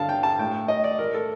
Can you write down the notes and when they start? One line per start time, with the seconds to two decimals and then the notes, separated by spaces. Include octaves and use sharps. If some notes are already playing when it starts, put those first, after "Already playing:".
Already playing: G2 D3 F5 A5
0.09 G5
0.23 A5
0.39 A2 G5
0.68 D#5
0.84 D5
0.99 A2 A#4
1.15 A4